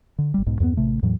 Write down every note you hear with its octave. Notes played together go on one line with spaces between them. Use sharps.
D3
G1 G3
B1 G#2 B2
E2 G2 G#3 B3
A1 C3 A3
E2 A2 E3 F#3